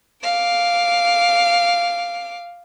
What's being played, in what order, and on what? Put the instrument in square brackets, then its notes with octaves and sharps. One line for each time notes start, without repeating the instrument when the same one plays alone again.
[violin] F5 D6